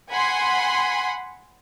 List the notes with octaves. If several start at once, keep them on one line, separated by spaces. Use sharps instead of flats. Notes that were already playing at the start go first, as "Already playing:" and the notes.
F#5 G#5 B5 C6